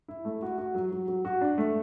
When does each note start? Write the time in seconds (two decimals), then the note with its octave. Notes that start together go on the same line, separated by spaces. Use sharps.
0.08 E4
0.25 A3
0.42 F#4
0.58 F#4
0.75 F#3
0.92 F#3
1.08 F#3
1.25 F#4
1.41 D4
1.58 A3